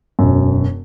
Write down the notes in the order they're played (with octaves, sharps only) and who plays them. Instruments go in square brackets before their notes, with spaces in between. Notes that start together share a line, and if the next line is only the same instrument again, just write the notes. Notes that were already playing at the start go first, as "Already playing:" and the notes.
[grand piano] E1 F#2